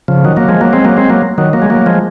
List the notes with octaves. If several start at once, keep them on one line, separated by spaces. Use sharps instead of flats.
C#3 F3
D#3 F#3
F#3 A#3
F3 G#3
F#3 A#3
G#3 C4
F#3 A#3
G#3 C4
F#3 A#3
D#3 F#3
F#3 A#3
G#3
F#3 A#3
F3 G#3